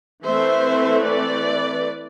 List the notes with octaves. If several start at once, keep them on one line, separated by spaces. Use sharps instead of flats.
E3 A3 C4 C5 E5
B4 D5